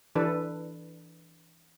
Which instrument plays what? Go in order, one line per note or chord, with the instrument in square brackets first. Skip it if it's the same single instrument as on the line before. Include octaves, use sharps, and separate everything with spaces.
[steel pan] E3 D4 A4 B4